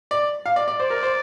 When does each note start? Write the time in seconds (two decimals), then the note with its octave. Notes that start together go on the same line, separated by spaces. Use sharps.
0.11 D5
0.46 F5
0.56 D5
0.68 D5
0.79 C5 D5
0.90 A#4
1.03 C5